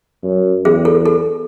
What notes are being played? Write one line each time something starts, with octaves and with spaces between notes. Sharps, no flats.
F#2
E2 G#4
A4
A4